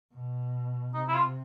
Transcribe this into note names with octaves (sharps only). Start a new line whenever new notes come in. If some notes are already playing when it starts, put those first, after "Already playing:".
B2
C3 D#4
E4
F4